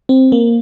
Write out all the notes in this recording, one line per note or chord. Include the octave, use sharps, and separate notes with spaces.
C4
A#3